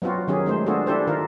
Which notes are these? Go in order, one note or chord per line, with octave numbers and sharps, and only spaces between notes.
F#3 B3 C4 F4 F#4
D#3 F#3 C#4 G4 G#4
G#3 A3 C5
B3 D4 F4 F#4 G#4 A4
D4 E4 G4 A4 C5
D#3 F4 A#4